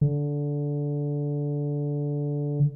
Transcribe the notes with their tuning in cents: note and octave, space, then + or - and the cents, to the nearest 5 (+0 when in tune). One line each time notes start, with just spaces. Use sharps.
D3 -15